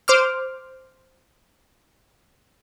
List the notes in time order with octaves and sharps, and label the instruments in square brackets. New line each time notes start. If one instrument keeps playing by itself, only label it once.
[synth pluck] C5 D6 F6